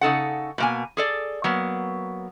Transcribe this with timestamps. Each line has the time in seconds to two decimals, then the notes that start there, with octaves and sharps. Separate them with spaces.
0.01 C#3 D#4 A4 F#5
0.58 B2 A#3 G#5
0.97 G#4 A4 D5
1.44 F#3 A#3 B3